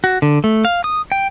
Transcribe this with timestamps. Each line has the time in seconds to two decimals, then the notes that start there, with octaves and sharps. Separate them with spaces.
0.04 F#4
0.22 D3
0.44 A3
0.65 F5
0.84 D#6
1.12 G5